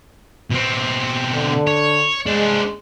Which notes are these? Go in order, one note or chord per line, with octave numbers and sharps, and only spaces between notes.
B2 C4
D3
C#5
G#3 D4 C5